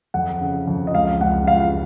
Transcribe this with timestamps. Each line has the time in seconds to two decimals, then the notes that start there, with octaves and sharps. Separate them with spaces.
0.14 F2 F#5
0.41 C#3
0.68 F2
0.87 D#5
0.94 C#2 F5
1.21 C#2 F#5
1.47 C#2 F5